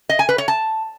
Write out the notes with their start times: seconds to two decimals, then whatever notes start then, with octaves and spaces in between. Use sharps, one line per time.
0.09 D#5
0.19 G#5
0.29 B4
0.38 C#5
0.48 A5